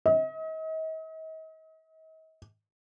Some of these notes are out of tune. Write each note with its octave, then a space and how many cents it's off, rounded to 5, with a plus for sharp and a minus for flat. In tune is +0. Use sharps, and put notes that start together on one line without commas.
D#5 +40